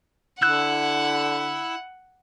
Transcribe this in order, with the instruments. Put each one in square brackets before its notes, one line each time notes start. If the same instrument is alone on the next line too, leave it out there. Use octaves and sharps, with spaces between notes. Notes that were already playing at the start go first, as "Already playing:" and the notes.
[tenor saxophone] D3 [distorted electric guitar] E4 [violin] F#5 [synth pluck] E6 F#6